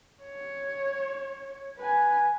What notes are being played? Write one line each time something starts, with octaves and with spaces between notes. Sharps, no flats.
C#5
B4 G#5